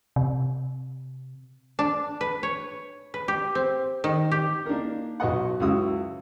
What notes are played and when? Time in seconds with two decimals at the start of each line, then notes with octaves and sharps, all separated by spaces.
0.16 C3
1.79 D4
2.21 B4
2.43 C#5
3.14 B4
3.28 G4
3.55 C4
4.04 D#3
4.31 G4
4.66 A#3 D4 D#4 A#4
5.20 B1 F#4 B4 D#5 F#5
5.60 C#2 F#2 E4 F#4 D#6 E6